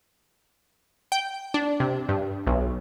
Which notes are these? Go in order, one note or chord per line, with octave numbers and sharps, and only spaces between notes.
G5
D4
C3
G2
B1